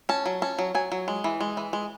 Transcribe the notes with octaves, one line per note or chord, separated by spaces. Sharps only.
C#4 A5
F#3
C#4 A5
F#3
F#3 G#5
F#3
G#3
E3
G#3
E3
G#3